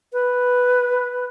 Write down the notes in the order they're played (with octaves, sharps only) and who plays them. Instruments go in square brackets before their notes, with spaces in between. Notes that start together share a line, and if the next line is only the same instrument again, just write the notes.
[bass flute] B4